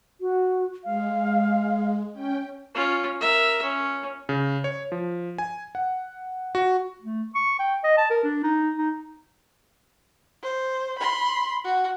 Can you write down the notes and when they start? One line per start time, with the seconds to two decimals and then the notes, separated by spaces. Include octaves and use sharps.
0.21 F#4
0.84 G#3 F5
2.13 C#4 G5
2.75 C#4 F4
3.20 A#4 E5
3.63 C#4
4.29 C#3
4.64 C#5
4.92 F3
5.38 G#5
5.75 F#5
6.55 F#4
7.02 A3
7.35 C#6
7.59 G5
7.84 D#5
7.97 A5
8.10 A#4
8.24 D4
8.44 D#4
8.77 D#4
10.43 C5
10.99 B5 C6
11.64 F#4